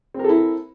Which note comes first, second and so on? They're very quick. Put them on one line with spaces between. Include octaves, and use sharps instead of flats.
C4 A#4 A4 E4